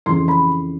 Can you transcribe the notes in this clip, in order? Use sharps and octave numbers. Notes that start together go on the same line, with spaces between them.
F2 C#3 E3 C6
B5